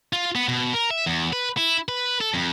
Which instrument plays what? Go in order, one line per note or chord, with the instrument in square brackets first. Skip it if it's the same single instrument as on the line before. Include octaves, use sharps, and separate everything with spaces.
[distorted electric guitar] F4
B3
B2
A#4
E5
E2
B4
E4
B4
A4
F2